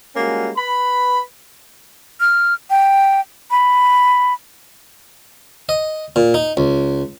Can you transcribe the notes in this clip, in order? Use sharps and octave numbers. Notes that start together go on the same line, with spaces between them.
G3 G#3 A#3 C#4 F4 F#4
B4 B5
F6
G5
B5
D#5
A#2
D#4
C#2